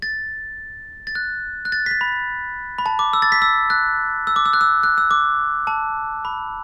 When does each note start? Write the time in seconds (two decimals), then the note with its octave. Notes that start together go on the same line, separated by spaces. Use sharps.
0.02 A6
1.07 A6
1.15 F#6
1.65 F#6
1.72 A6
1.86 B6
1.91 A6
2.01 B5
2.78 B5
2.86 A5
2.99 D6
3.13 E6
3.22 A6
3.32 B6
3.42 E6
3.70 F#6
4.27 E6
4.36 D6
4.46 E6
4.53 F#6
4.61 E6
4.83 F#6
4.98 E6
5.11 D6
5.67 A5
6.25 B5